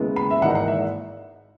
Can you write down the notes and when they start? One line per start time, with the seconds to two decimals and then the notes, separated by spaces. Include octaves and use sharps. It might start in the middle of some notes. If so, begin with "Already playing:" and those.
Already playing: D#2 C#3 G#3 B3 E4
0.16 B5
0.31 E5
0.41 G#1 G#2 E3 A#3 D#4 F#5
0.55 F#5
0.68 E5